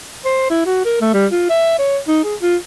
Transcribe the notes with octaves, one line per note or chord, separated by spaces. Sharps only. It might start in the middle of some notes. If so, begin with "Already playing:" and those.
C5
E4
F#4
A#4
A3
G3
F4
E5
C#5
D#4
G#4
F4